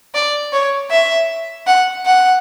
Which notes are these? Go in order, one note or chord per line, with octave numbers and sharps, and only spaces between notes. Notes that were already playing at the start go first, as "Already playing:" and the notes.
D5
C#5
E5
F#5
F#5